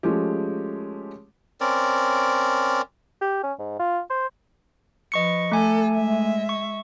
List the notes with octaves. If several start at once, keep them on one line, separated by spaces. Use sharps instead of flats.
F3 G#3 A3 C#4 G4
C4 C#4 A#4 D5
G4
C#4
G#2
F4
C5
F3 B4 D#5 C#6 C#7
A3 A4 G#5
G#3 E5
C#6